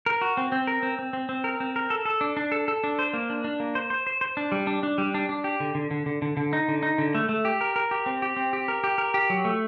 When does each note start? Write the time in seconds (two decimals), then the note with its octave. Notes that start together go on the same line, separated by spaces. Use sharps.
0.06 A#4
0.21 F#4
0.37 C4
0.52 C4
0.67 A#4
0.83 C4
0.99 C4
1.13 C4
1.29 C4
1.44 A#4
1.60 C4
1.76 A#4
1.90 A4
2.05 A4
2.21 D4
2.37 D4
2.52 A4
2.68 A4
2.84 D4
2.99 C5
3.13 A#3
3.30 D4
3.44 D4
3.60 A#3
3.75 C5
3.90 C5
4.07 C5
4.21 C5
4.37 D4
4.52 G3
4.67 D4
4.83 D4
4.98 G3
5.14 D4
5.29 D4
5.44 G4
5.60 D3
5.75 D3
5.91 D3
6.06 D3
6.22 D3
6.37 D3
6.53 D#4
6.68 D3
6.83 D#4
6.98 D3
7.15 A3
7.29 A3
7.45 G4
7.61 A#4
7.76 A#4
7.91 G4
8.06 C4
8.22 G4
8.37 C4
8.53 G4
8.68 A#4
8.84 G4
8.98 A#4
9.14 G4
9.30 F#3
9.45 A3